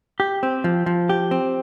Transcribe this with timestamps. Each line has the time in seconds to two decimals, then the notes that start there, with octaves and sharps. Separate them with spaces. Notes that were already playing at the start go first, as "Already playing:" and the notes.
0.20 G4
0.43 C4
0.64 F3
0.86 F3
1.10 G4
1.31 C4